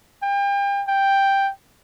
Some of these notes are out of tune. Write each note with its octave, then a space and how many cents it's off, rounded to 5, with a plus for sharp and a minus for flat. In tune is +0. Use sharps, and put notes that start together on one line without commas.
G5 +35
G5 +5